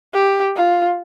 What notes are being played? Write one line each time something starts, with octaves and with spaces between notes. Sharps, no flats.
G4
F4